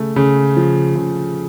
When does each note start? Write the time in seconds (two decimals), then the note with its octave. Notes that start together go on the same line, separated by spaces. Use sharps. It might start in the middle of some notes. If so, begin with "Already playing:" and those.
Already playing: C#3 A3
0.16 C#3
0.56 F3
0.95 C#3